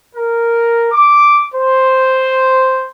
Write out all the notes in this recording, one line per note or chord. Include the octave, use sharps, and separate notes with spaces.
A#4
D6
C5